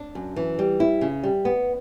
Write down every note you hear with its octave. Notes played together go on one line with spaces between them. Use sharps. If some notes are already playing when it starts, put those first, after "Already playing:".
Already playing: D4
F#2
E3
G3
E4
C#3
G3
B3